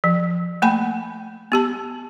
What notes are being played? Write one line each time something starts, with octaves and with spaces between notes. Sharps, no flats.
F3
A3 A#3 G5 G#5 B5
B3 G4 A5